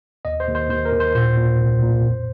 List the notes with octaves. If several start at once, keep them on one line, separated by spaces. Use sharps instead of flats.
D#2 D#5
C5
D#2
C5
D#2 C5
A#4
D#2
C5
A#2 C5
A#2
C2
A#2
F2